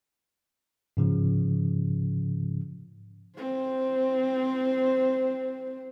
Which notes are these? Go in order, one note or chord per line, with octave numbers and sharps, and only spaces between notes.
G#2 C#3 F3
C4 C5